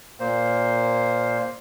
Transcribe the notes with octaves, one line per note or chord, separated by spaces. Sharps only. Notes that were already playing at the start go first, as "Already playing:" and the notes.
A#2 A#3 C5